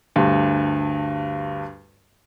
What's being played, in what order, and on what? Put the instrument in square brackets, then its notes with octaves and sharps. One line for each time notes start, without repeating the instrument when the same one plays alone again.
[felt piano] D2 G2